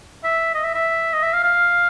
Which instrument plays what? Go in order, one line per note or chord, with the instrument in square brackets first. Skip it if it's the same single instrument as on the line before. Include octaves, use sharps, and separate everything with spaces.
[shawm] E5
D#5
E5
E5
D#5
E5
F5
F5